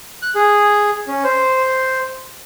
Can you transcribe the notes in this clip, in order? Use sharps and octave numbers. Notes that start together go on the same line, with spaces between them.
F#6
G#4
C#4
C5